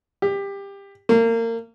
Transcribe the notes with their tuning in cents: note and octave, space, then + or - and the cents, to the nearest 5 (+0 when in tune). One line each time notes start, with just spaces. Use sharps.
G4 +20
A#3 -30